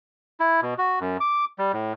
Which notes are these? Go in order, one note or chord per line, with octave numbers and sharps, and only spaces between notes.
E4
B2
F#4
F#2
D6
G3
A2